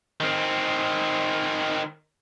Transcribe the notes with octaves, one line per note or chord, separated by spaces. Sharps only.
D#3 C4